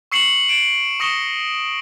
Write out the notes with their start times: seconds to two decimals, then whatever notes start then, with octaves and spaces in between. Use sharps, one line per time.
0.12 C#6 E6 C7 C#7 E7 F#7
0.49 D7 E7
1.00 C#6 D#6 A#6 C#7 E7 G7